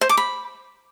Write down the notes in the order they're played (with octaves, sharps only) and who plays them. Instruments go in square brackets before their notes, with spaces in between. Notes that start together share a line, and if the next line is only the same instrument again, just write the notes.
[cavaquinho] C5
D6
B5